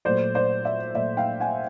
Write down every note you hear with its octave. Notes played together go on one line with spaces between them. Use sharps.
A#2 F#3 A3 C5 D5
C5 D5
D5 E5
A#2 F#3 A3 D5 E5
F5 G5
F#5 G#5